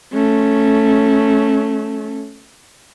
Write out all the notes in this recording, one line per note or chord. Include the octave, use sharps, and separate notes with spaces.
A3 C#4